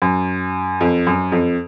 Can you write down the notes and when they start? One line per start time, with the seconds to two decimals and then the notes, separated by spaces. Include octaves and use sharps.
0.02 F#2
0.81 F2
1.07 F#2
1.32 F2